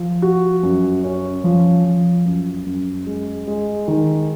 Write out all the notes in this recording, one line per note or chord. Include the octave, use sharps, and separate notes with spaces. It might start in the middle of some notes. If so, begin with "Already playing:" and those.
Already playing: F3
F#4
F#2
C#4
F3
F3
F#2
F#2
G#3
G#3
D#3